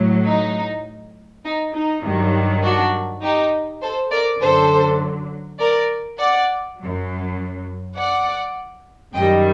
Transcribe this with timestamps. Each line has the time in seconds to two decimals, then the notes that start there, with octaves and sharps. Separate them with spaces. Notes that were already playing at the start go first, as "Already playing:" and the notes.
Already playing: A2 F#3
0.26 D#4
1.45 D#4
1.74 D#4
2.04 G2 D#3 F#3
2.63 D4 F#4
3.22 D#4 G4
3.82 A4 C5
4.11 A#4 D5
4.40 F#2 D3 F#3 A4 C5
5.59 A#4 D5
6.19 D5 F#5
6.77 F#2 F#3
7.96 D5 F#5
9.15 F#2 D#3 G3 D#5 G5